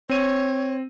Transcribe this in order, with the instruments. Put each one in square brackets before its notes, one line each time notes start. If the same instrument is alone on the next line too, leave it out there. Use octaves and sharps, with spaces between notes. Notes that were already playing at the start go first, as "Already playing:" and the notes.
[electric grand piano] C4 D#7 [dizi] C#5